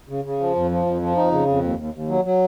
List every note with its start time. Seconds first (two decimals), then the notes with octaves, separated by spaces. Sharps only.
0.09 C#3
0.25 C#3
0.40 F3
0.56 F2
0.71 F3
0.86 F2
1.02 F3
1.17 F2 D#4
1.32 C#3
1.47 F2
1.63 D#2
1.78 D#2
1.94 D#2
2.09 F#3
2.25 F#3